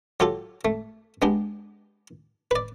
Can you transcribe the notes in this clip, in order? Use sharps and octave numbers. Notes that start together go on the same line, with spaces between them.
F#3 F4 G4 A4
A3
G#3 B3 D4 G4
B4 D5